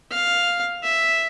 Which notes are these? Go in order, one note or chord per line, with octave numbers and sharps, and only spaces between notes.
F5
E5